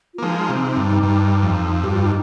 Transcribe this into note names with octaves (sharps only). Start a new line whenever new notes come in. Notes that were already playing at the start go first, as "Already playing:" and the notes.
F4
A#3
F3 G#3 D#4
C3
G2
G2
F2
G2 G4
F4
D#4